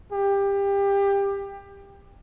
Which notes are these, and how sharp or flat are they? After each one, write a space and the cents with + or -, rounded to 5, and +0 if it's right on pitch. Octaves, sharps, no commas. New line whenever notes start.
G4 +20